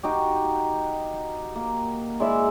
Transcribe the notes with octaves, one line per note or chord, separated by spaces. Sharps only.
D#4 F#4 G4
A#3
G#3 E4 D5 E5